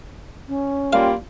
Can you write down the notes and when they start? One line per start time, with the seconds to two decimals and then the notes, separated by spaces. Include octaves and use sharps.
0.48 C#4
0.93 G3 A#3 F4 F5